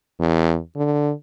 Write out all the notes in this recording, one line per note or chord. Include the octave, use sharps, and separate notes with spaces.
E2
D3